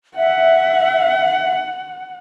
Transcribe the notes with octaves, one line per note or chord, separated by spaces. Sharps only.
E5 F#5